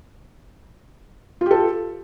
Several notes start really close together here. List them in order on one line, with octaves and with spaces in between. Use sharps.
F4 G4 A4